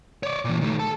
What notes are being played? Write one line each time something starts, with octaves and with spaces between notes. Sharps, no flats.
C#5 D5
A#2 E3
D#3 A3
A4 A5